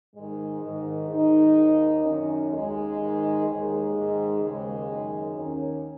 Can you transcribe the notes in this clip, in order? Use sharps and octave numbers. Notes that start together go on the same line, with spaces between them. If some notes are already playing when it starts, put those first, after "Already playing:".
G#2 D#3 G#3
G#2 D#3
G#2 D#3 D#4
D#2 D#3
F#2 D#3 C#4
D#2 D#3 G#3
G#2 D#3
D#2 D#3 G#3
G#2 D#3
D#2 C#3 G#3
F#2
D#3
D#2 D#3 C#4